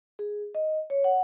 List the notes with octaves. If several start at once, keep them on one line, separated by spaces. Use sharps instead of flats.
G#4
D#5
C#5
F#5